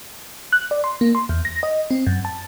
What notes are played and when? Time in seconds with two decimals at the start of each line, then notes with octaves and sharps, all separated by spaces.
0.53 F#6
0.71 D5
0.84 C6
1.01 A#3
1.15 C6
1.29 E2
1.45 A#6
1.63 D#5
1.91 C4
2.07 F#2
2.25 A5